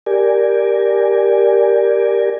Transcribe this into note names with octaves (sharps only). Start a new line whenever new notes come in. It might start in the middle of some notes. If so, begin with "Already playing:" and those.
G4 A#4 D5 G#5